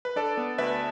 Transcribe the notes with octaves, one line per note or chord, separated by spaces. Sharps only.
B4
D4 A4 D5
B3
D2 B4 E5